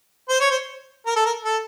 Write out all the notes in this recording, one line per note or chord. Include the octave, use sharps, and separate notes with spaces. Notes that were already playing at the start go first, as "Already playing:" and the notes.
C5
C#5
C5
A#4
A4
A#4
A4